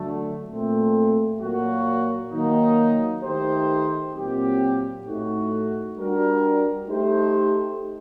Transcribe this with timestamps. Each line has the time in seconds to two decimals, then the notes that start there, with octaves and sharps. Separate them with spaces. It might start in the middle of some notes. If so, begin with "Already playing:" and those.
Already playing: D3 F#3 A3
0.48 A#2 A3 C4
1.39 A#2 F#3 A#3 F#4
2.31 D#3 F#3 A#3 D#4
3.22 D#3 A3 D#4 G4 C5
4.14 A#2 F#3 C4 G4
5.04 A2 A3 D#4 F#4
5.96 G3 D4 F#4 A#4
6.87 A3 D#4 G4 C5